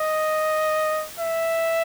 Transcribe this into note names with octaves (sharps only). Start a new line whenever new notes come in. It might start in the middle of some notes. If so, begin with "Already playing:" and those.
Already playing: D#5
E5